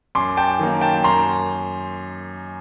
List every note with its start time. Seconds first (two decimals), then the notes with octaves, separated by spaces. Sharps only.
0.15 F#2 C6 D6
0.37 G5 A5
0.59 D#3 F#3 A#3
0.81 G5 A5
1.04 F#2 A#5 C6